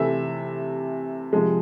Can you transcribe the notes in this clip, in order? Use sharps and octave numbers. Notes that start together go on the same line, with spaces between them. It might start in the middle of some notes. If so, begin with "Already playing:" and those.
Already playing: C3 E3 A3 E5
C3 F3 G#3